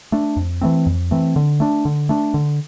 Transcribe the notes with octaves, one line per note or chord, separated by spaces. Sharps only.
A3 D4
F2
E3 A3 C4
F2
E3 A3 C4
D3
A3 D4
D3
A3 D4
D3